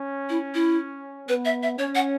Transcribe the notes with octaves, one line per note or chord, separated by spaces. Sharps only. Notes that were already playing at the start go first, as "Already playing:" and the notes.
Already playing: C#4
E4
E4
B3 B4
E5
E5
C#4 C#5
F#5